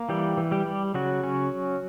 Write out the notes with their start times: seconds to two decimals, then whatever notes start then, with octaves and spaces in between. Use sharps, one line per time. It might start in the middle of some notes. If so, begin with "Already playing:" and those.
Already playing: A#3
0.09 E3 G3 G4
0.37 E3
0.51 G3 G4
0.66 G3
0.94 C#3 F#3 F#4
1.23 C#4